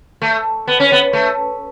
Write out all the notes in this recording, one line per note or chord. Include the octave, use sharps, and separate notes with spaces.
A3
B3
C#4
B3
A3